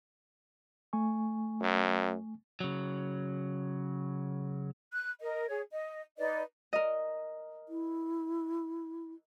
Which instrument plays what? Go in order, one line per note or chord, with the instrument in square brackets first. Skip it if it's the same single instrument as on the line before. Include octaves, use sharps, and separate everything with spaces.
[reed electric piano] A3 G#5 C#6
[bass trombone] F#2
[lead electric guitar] C#3 F#3
[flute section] F#6
A#4 D#5
G#4 C#5
D#5
D#4 B4 D5 D#5
[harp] A#4 D#5
[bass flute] E4